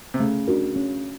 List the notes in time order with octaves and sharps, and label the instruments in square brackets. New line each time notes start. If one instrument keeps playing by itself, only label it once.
[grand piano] C3
[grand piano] C#3 [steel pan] A3
[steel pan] D4 F#4 A#4
C#4